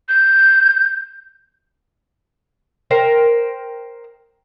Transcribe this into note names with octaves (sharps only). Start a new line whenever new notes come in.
G6
A#4 C5 G5